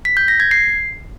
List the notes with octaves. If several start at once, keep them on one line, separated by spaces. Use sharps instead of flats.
B6
G6
A#6
G#6
C7